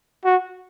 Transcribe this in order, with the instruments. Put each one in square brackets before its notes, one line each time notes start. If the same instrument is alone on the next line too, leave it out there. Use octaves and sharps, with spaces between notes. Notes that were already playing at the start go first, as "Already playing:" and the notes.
[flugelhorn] F#4